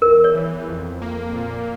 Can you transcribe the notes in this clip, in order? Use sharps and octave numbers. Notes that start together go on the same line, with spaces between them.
E2 A#4
C#5
E3
F2
A#3
A#2